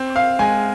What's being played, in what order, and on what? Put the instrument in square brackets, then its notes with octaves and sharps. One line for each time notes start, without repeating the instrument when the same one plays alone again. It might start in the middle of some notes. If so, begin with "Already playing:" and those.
Already playing: [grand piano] C4
[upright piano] F5
[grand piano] G#3 [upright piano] G#5